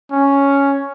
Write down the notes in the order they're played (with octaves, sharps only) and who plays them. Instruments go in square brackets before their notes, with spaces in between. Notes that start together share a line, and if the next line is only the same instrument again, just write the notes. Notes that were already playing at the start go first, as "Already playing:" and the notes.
[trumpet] C#4